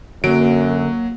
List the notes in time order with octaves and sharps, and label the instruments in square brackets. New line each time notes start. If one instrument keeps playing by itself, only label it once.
[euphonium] F#2 [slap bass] D3 [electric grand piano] F#3 D7 [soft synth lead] A#3